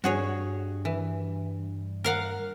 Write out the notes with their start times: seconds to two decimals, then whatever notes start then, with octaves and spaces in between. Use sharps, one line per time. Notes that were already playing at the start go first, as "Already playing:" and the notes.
0.04 G2 F#4 G#4 C#5
0.85 E3
2.04 A#4 F5 F#5